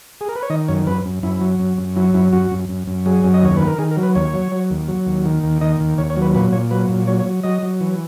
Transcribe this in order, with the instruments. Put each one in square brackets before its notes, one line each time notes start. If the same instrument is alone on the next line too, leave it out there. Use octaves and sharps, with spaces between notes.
[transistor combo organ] G#4
A#4
B4
C#5
D#3 D#5
F#2 C#5
F#2 B4
F#2
F#2 E4
F#3
F#2
F#2
F#3 E4
F#2 E4
F#2 F#4
F#2
F#2
F#2
F#3 G#4
F#2
D#5
D#2 C#5
D#3 B4
A#4
D#3 G#4
A#4
F#3
B4
D#2 C#5
F#3
F#3
D#2
F#3
D#2
D#3
D#2
D#3 D#5
D#2
D#2 C#5
C#5
F#3
B4
A#2 B4
A#2 C#5
F#3 B4
A#2
F#3 C#5
C#5
F#3
F#3 D#5
F#3
E3